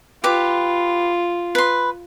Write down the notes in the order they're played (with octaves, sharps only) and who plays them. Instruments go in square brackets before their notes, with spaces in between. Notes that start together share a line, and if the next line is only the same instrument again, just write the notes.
[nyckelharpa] F4 [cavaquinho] G4 B4 D6
[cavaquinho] B4 C6